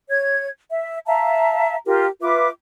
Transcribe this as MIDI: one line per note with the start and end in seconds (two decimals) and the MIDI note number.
0.09 0.48 73
0.09 0.48 92
0.70 0.99 76
1.06 1.75 76
1.06 1.75 77
1.06 1.75 81
1.06 1.75 82
1.85 2.07 65
1.85 2.07 67
1.85 2.07 70
2.20 2.47 65
2.20 2.47 71
2.20 2.47 76
2.20 2.47 86